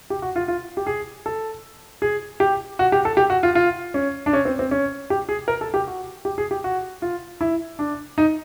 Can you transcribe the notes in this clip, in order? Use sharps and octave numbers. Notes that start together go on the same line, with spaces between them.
G4
F#4
F4
F4
G4
G#4
A4
G#4
G4
F#4
G4
A4
G4
F#4
F4
F4
C#4
D4
C#4
C4
C4
C#4
G4
G#4
A#4
A4
G4
F#4
G4
G#4
G4
F#4
F4
E4
D4
D#4